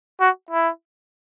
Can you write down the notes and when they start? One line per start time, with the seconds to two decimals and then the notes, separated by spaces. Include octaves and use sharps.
0.20 F#4
0.51 E4